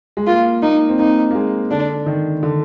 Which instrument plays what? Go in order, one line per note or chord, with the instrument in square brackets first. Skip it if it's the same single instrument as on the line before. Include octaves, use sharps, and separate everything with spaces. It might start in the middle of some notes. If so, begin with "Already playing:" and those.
[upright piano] G#3
[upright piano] A#3 [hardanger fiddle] F4
[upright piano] A#3 [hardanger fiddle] D#4
[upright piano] C4
[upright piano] A#3 [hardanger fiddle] D#4
[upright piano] A#3
G#3
[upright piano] D3 [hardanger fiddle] D4
[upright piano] D#3
D3